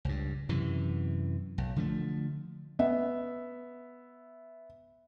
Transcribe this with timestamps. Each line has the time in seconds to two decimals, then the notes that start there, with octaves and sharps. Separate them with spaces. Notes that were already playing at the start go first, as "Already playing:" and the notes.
0.05 C#2 G2
0.49 F#2 C3 E3
1.58 B1
1.76 D3 F3 G#3 A3
2.79 B3 E5